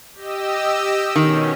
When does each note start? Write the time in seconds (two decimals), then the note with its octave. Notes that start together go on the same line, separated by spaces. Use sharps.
0.14 G4 D#5 E6
1.16 B2 D#3 C#4